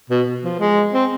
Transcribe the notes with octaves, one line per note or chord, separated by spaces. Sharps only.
B2
F3
G#3
C4